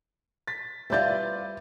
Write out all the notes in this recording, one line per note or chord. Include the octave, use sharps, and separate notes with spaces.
A6 B6
G3 F4 B4 C5 D5 E5 G6 A6